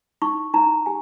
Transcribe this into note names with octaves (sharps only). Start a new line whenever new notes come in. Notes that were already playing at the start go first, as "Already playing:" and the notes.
D#4 C#6
D#4 A#5
G4 G#5